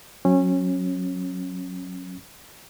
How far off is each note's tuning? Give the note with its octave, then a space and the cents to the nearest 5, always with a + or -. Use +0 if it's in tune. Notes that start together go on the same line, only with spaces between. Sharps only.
F#3 -15 C#4 -25